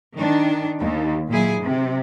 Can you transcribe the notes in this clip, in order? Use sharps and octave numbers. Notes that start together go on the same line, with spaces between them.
D#3 D4
D#2
A#2 F#3 E4 G#4
C3